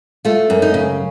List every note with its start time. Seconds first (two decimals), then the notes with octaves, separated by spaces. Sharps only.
0.25 A3 F4
0.50 F#2
0.62 D#4
0.74 C#3